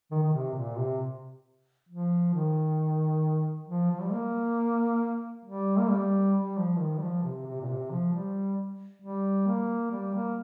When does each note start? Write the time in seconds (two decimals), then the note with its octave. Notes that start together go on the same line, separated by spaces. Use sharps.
0.11 D#3
0.22 D#3
0.33 C3
0.55 A#2
0.77 C3
1.89 F3
2.34 D#3
3.68 F3
3.92 F3
4.01 G3
4.12 A#3
5.45 G3
5.78 A#3
5.90 G3
6.35 G3
6.58 F3
6.79 D#3
6.98 G3
7.02 F3
7.24 C3
7.46 C3
7.61 A#2
7.68 C3
7.91 F3
8.13 G3
9.02 G3
9.47 A#3
9.92 G3
10.14 A#3